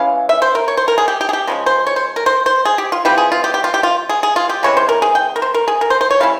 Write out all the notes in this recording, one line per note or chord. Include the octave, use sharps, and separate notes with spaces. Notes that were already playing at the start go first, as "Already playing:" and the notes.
Already playing: E3 G#3 C#4 F5
E5
C5
A#4
C#5
C5
A#4
G#4
G4
G4
G#4
G4
C#3 F3 G#3 C#4
C5
C#5
C5
A#4
C5
C5
G#4
G4
F4
E3 G3 C4 F4 G4
G#4
F4
G4
G4
F4
G4
F4
G#4
G#4
F4
G4
C#3 E3 G#3 C4 C#5
C5
A#4
G#4
G5
A#4
C5
A#4
G#4
A#4
C5
C5
C#5
G3 C#4 E4 F5